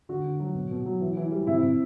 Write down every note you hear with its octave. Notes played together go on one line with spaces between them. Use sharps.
D3 F#4
D3
F#3
B2
B2
F#3
E3
E3
G3
C3 E4
C3